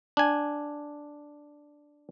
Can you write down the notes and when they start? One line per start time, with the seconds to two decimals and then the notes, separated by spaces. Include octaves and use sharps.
0.17 D4 G#5